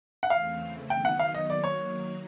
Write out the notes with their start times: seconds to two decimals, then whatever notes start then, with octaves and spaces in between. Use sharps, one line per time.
0.23 F#5
0.30 E2 C#3 E3 A3 C4 F5
0.90 D#3 F#3 B3 D#4 G5
1.05 F#5
1.19 F5
1.34 D#5
1.49 D#3 F#3 A#3 D5
1.64 C#5